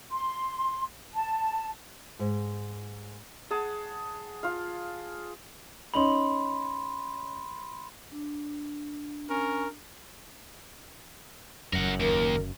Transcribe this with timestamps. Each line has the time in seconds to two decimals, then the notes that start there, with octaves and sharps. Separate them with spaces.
0.11 C6
1.15 A5
2.19 G#2
3.51 G#4 F#5 A5
4.43 F4 F5
5.94 C#4 D#4 B5 C6 F#7
8.12 D4
9.30 C#4 A#4
11.73 F#1 F#2 A#4 F#5
12.00 D#2 A#4